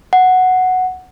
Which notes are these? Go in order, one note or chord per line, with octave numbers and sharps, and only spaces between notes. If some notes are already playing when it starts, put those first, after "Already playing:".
F#5